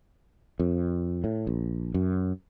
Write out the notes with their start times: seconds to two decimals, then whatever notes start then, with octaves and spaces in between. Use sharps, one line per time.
0.60 F2
1.24 A2
1.47 A#1
1.94 F#2